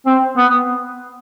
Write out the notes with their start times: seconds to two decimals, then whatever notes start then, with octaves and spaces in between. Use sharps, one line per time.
0.06 C4
0.37 B3